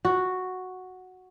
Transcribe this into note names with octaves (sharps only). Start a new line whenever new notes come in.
F#4